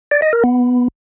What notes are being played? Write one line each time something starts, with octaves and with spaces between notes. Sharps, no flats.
D5
D#5
A#4
B3